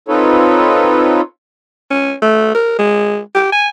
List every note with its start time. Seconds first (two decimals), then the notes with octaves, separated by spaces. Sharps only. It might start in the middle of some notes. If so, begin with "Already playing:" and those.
0.08 C4 D#4 F4 A4 B4 C#5
1.91 C#4
2.22 A3
2.55 A#4
2.79 G#3
3.35 G4
3.53 G#5